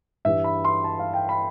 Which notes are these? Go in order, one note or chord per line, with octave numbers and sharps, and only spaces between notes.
G2 E3 G3 E5
B5
C6
A5
F5
G5
B5